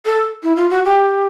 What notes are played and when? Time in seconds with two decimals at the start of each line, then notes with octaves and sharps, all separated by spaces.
0.05 A4
0.43 E4
0.56 F4
0.70 F#4
0.85 G4